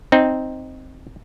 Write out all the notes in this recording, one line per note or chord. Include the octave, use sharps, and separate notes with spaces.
C4 D#4